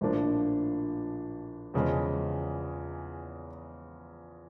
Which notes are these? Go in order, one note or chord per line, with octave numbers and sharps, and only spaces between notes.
A#1 A2 F3 A#3 D4
E2 C#3 F3 G#3